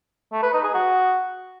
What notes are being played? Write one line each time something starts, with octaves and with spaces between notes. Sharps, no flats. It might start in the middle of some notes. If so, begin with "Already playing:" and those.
A3
B4
D#4
G#4
F#4